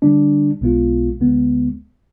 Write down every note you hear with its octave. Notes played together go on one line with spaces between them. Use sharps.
D3 G3 D4
B1 B2 G#3 B3 F4
D2 D3 G#3 B3